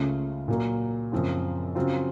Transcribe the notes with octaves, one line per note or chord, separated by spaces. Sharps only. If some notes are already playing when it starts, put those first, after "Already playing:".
Already playing: C#2 C#3 A3 C#4 F4
A#2 F#3 A#3
F#2 C#3 F3 C4 F4
C#3 F#3 C4 F4